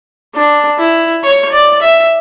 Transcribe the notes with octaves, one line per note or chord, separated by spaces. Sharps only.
D4
E4
C#5
D5
E5